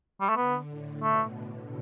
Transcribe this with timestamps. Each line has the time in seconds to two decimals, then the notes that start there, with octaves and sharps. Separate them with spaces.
0.21 G3
0.29 A3
0.36 D3 B3
0.69 A2
1.02 B2 A3
1.35 D3